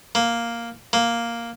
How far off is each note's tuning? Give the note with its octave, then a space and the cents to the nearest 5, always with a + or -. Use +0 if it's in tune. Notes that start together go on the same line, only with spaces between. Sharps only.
A#3 +0
A#3 +0